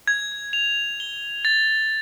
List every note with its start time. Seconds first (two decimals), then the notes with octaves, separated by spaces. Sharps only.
0.08 G#6
0.53 F7
1.00 G7
1.45 A6